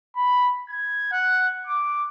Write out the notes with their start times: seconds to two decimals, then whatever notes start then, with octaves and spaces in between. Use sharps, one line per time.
0.15 B5
0.69 G#6
1.12 F#5
1.67 D6